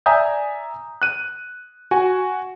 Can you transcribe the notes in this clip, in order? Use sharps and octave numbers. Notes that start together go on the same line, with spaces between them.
D5 E5 G#5 A#5 D#6 G6
F#6 D#7
F#4 G#5